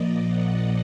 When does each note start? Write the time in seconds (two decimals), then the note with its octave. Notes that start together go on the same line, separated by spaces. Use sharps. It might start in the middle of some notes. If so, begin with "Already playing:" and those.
Already playing: A#2 F3 A#3 D5 D#5
0.27 F#5